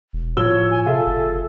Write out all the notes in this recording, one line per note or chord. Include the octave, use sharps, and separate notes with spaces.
E1
A2 F3 C#5 E6 G7
G#5
C3 F4 G#4 A4 E5
F#1